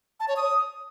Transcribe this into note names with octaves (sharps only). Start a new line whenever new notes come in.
A5
C#5
D#6